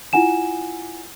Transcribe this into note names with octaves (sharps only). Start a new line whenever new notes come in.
E4 F4 F#5 G#5 E7